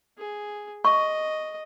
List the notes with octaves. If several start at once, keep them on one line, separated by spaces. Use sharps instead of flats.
G#4
D#5 C#6